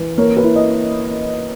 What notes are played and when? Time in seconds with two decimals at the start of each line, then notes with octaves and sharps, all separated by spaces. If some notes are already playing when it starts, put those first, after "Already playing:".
Already playing: E3
0.18 A#3 C#5
0.37 B4
0.44 E4
0.56 D#5